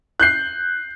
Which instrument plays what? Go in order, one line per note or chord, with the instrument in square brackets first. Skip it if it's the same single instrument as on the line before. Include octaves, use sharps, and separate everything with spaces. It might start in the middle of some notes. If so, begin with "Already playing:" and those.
[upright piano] F#6 G6 C7